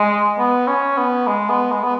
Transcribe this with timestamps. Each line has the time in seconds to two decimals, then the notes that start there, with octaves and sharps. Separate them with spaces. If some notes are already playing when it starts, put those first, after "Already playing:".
Already playing: G#3
0.38 B3
0.68 C#4
0.97 B3
1.27 G#3
1.49 B3
1.71 G#3
1.83 B3